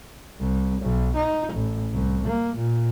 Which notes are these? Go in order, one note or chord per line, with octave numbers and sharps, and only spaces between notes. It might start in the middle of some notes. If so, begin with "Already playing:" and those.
C2
B1
D#4
A1
C2
A#3
A#2